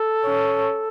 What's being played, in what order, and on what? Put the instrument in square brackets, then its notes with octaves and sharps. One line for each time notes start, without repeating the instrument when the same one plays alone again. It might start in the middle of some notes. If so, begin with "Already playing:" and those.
Already playing: [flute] A4
[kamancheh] C#4